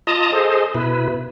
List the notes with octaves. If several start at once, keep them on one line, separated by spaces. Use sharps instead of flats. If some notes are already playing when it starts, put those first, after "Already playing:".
F4 D#5 A5 A#5 D#6
G#4 A4 C5 D#5
B2 E4 B4